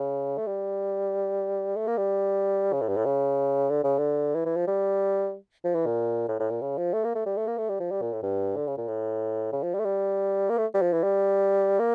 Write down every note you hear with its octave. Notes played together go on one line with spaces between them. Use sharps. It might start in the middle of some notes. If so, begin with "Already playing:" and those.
Already playing: C#3
A3
G3
A3
A#3
G3
C#3
A2
G2
A2
C#3
D3
C#3
D3
E3
E3
F3
G3
F3
E3
A#2
A2
A2
A#2
C#3
F3
A3
A#3
A3
G3
A3
A#3
A3
G3
F3
G3
A#2
A2
G2
D3
C#3
A#2
A2
C#3
F3
G3
A3
G3
A#3
A3
G3
F3
E3
G3
A#3